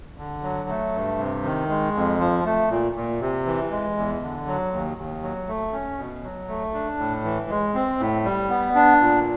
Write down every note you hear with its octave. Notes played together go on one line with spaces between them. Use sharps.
D3
F#3
A3
G2
C3
D#3
G#3
F2
F3
A3
A#2
A#2
C3
E3
G#3
E2
D3
F#3
D#2
D#2
F#3
A3
C#4
B2
F#3
A3
D4
A2
E3
G#3
C4
A2
G3
B3
D4
A#2